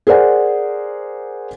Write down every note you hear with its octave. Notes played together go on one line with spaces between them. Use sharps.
G#4 A#4 C5 D5 F#5 G#5